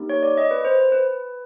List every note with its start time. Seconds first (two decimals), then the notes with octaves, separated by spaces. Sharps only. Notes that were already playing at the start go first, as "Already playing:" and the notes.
Already playing: A#3 D#4 G4
0.10 C#5
0.23 D5
0.38 D#5
0.51 B4
0.65 C5
0.92 B4